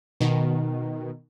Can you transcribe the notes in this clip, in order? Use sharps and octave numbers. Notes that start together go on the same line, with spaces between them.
B2 D#3